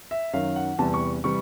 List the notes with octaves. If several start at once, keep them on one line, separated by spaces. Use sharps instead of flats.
E5
F#2 D#3 F#3 F5
F#5
E2 C3 E3 G3 A5
C#6
C3 E3 G3 C#6